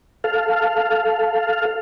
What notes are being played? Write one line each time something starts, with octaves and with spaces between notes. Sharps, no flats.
A4 F5